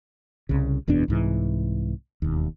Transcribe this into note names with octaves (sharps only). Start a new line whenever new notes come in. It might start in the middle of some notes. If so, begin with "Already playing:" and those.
C2 C#3
F#1 E2 B2 D4
C2 G#2 E3
E1 D#2